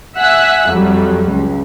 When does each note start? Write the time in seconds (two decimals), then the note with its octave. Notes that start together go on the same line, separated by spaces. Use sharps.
0.16 E5 F#5 G#5 E6 F#6
0.68 F2 F#3 G3
1.29 C#2